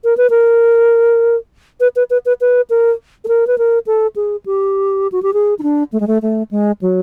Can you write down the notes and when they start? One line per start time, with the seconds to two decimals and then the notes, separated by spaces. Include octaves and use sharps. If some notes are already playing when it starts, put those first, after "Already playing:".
0.04 A#4
0.17 B4
0.30 A#4
1.80 B4
1.96 B4
2.10 B4
2.26 B4
2.41 B4
2.70 A#4
3.24 A4
3.28 A#4
3.47 B4
3.58 A#4
3.87 A4
4.16 G#4
4.46 G4
5.12 F#4
5.23 G4
5.34 G#4
5.59 D#4
5.63 D4
5.92 A3
6.00 G#3
6.07 A3
6.22 A3
6.51 G#3
6.82 F#3